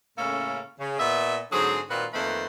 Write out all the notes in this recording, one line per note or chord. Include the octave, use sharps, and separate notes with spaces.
A2 C#3 A#3 C#4 E4 A4
C#3
A#2 B3 D#5 E5
G#2 D3 F#3 C4 G#4
A#2 D#3 C4 F4 F#4 B4
F2 D#3 A3 A#3 B4 C5